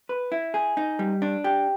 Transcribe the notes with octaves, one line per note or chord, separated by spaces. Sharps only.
B4
E4
G#4
D#4
G3
D4
G4